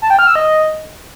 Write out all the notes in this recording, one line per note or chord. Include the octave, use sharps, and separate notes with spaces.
A5
G5
F6
E6
D#5